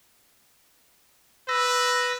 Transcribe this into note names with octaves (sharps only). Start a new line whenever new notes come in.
B4 E6 A#6